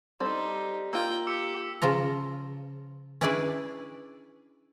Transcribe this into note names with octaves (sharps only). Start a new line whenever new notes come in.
G3 C4 D#4 G4 A4
A#3 F4 G5 A#5 E6
G4 D6 E6 C#7
C#3 F3 F4 A#5
C#4 D4 E4 G#4 B4 D5